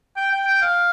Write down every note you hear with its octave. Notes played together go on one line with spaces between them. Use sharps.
G5
G5
G5
F5